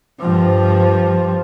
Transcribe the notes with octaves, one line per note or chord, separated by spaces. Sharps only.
G2 F3